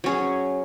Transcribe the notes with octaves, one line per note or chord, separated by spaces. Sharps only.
F#3 C#4 G#4